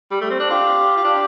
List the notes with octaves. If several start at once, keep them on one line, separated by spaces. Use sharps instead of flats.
G3
A3
C4
D4
F4 G4
F4
D4